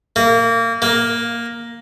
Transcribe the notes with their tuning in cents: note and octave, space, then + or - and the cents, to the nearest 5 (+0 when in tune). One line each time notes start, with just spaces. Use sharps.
A#3 -25
A#3 +5